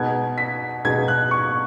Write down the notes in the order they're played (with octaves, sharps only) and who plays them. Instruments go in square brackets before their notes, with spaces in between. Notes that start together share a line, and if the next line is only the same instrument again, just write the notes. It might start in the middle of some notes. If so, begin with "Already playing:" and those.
Already playing: [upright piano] B2 G#3 B3 D#4 G#6
B6
B2 G#3 B3 D#4 G#6
F#6
C#6